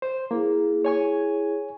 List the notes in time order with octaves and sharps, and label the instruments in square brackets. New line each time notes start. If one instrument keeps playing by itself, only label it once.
[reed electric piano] C5
[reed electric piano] A#3 [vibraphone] E4 G#4
[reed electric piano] C#5 G#5 C#6